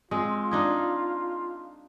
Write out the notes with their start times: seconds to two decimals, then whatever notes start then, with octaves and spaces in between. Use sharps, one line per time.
0.11 G#3 C4 F4
0.51 D4 D#4 G#4